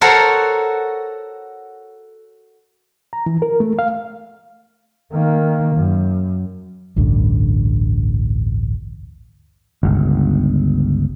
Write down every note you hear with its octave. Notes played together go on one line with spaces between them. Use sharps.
F#4 A4 A#4 C5 C#5 F#5
A#5
E3
A#4
A3
F5
D#3 A#3
F#2
A1 D2 G2 D3
G1 C#2